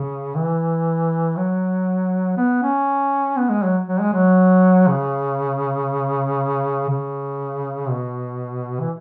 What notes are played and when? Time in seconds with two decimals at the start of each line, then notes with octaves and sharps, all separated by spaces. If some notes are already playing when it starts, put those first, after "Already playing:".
Already playing: C#3
0.35 E3
1.37 F#3
2.37 B3
2.63 C#4
3.37 B3
3.49 G#3
3.63 F#3
3.87 F#3
4.00 G#3
4.13 F#3
4.87 C#3
6.89 C#3
7.89 B2
8.80 E3